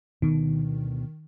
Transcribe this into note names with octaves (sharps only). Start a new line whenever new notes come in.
D2 B2 D#3 B3